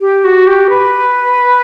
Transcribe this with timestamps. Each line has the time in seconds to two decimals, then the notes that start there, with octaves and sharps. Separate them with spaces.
0.01 G4
0.24 F#4
0.47 G4
0.70 B4